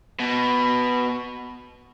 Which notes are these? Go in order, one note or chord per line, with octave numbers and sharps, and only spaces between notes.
B2